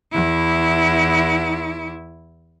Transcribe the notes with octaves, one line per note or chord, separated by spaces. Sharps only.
E2 E4